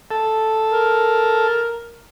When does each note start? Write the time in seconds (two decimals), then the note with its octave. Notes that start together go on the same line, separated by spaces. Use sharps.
0.11 A4
0.73 A#4